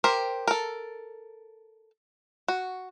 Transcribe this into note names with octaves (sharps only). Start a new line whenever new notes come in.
G4 A#4 C5
A4 A#4
F#4